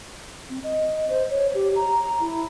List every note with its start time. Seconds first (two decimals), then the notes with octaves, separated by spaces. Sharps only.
0.49 C4
0.63 D#5
1.09 C5
1.30 C#5
1.54 G4
1.76 A#5
2.20 E4